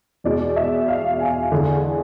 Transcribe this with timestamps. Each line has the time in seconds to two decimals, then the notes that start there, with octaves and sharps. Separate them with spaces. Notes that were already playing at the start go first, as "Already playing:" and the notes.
0.24 E2 B2 G#3 D5
0.56 E5
0.88 F5
1.20 G#5
1.52 E2 D3 G#3